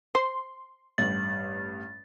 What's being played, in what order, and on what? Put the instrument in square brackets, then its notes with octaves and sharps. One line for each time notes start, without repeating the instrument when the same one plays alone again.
[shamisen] C5 [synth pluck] C6
[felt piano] A1 G2 [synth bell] A6